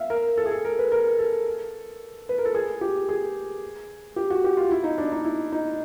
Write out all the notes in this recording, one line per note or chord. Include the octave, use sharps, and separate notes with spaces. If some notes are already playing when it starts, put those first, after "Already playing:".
Already playing: E5 F5
A#4
A4
G#4
A4
A#4
B4
A#4
A4
B4
A#4
A4
G#4
G4
G#4
G4
F#4
G4
F4
E4
D#4
D4
D#4
E4
D#4